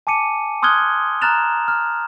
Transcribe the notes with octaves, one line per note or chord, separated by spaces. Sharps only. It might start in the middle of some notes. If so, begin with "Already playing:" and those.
G#5 A5 D6 C#7 D#7
C6 D#6 F6 F#6 G#6 G7
A#5 F6 F#6 A6 E7 F7
F6